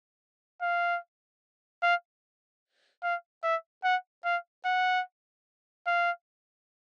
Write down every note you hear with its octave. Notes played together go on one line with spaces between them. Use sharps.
F5
F5
F5
E5
F#5
F5
F#5
F5